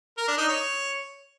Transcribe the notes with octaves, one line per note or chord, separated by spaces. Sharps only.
A#4
D4
D#4
C#5